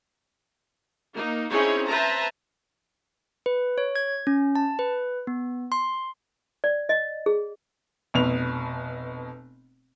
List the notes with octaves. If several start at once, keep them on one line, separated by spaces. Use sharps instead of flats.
A#3 D#4
C4 C#4 D#4 E4 G#4 C#5
B4 C5 E5 A5 A#5
B4
C#5
G#6
C#4
A5
B4
B3
C6
D5
D#5
G#4
F1 B2 F7